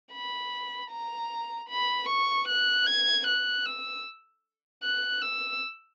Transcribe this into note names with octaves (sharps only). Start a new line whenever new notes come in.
B5
A#5
B5
C#6
F#6
G#6
F#6
E6
F#6
E6